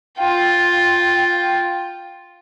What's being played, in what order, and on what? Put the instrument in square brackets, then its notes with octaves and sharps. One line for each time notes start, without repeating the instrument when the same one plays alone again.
[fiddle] F4 G5